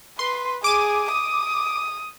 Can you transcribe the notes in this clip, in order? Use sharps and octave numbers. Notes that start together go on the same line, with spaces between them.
B4 C6
G#4 D6 D#7
D#6